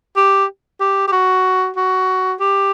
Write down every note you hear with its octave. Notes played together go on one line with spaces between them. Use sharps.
G4
G4
G4
F#4
F#4
G4